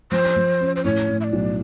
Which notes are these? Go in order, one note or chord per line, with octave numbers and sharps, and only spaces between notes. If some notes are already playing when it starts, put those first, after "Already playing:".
F3 C5
F3
C#4
C5
A2 C#5
A2
E5
D5
B1